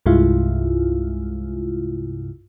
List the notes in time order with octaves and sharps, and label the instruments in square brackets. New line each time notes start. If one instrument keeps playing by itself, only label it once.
[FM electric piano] C2 G2 C3 G#3 E4 F4